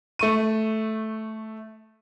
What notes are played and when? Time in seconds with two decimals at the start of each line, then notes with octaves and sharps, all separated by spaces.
0.19 A3 C#6 D#7